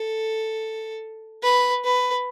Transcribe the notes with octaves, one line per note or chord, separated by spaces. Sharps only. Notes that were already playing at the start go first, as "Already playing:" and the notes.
Already playing: A4
B4
B4